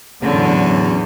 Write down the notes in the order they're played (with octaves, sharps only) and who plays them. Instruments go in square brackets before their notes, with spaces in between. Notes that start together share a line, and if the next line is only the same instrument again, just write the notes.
[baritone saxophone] E2 [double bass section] A2 F#3 C#4 [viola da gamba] D3